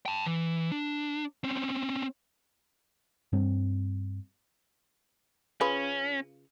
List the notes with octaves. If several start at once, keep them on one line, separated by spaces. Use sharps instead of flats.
G5 A5
E3
D4
C4 C#4
G2 G3 C4
C#3 C#4 F4 B4